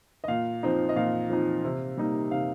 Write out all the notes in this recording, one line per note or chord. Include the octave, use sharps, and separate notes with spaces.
D#5
A#2 F5
F3 C4 D#4
D#5
A#2 F5
F3 C4 D#4
C3
G3 A#3 D#4
C3 F5